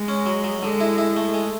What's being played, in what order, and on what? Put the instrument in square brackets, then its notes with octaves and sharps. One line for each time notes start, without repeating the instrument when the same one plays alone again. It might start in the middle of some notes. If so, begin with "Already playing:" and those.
Already playing: [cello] G#3
[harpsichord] C#4
F#3
F#3
[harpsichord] D3 [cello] G#3
[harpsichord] E4
E4
A3
G#3